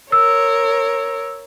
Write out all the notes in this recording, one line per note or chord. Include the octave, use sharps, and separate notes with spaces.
A#4 C#5 E6